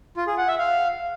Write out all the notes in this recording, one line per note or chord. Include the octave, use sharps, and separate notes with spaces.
F4
G#4
F#5
E5
F5